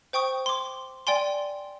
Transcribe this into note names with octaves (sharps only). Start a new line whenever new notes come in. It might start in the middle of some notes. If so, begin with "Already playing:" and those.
C5 G5 C#6 D#6
C6 D6
D5 G5 G#5 C6